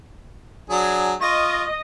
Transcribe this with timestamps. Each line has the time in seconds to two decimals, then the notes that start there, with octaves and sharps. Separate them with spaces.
0.70 F#3 D4 G#4
1.22 F4 D#5 C#6